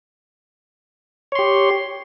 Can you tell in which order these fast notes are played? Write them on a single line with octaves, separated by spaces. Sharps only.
C#5 C6 G4